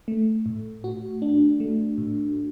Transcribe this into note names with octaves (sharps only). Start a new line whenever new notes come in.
A3
A2
F#4
D4
A3
A2